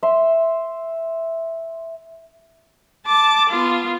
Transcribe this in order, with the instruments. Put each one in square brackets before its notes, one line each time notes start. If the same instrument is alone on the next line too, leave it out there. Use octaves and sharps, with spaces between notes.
[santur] E5 C6
[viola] A5 D6
B3 F4